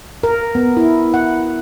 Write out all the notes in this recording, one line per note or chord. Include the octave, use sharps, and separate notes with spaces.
A#4
B3
E4
F#5